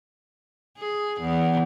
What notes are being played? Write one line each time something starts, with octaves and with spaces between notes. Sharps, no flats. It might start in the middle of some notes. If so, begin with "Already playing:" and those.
G#4
E2